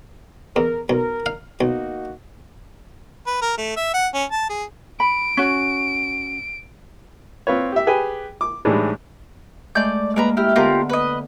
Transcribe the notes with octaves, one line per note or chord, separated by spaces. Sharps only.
E2 A#4
B1 A#4
F5
B1 A#3 D#4 F#4
B4
A#4
A3
E5
F#5
C#4
A5
G#4
B5 D7
C#4 F#4
C4 F4 B4 C#5
G4 E5
G4 G#4 B4 G5 G#5
D6
A2 E3 G3 G#3 D4 D#4
G#3 A3 D5 G6
G#3 A#3 A#4 B4 A#5
E4 G4 F6
D3 B3 F4 G4 A#4
B4 D#5